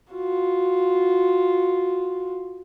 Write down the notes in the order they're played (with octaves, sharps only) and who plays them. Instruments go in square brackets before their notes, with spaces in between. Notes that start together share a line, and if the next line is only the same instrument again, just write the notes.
[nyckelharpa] F4 F#4